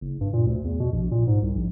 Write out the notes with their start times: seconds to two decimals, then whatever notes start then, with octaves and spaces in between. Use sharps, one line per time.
0.01 F#1
0.21 G2
0.33 A#2
0.46 D2
0.65 E2
0.80 B2
0.93 A#1
1.11 A#2
1.27 G#2
1.42 C2
1.56 A#1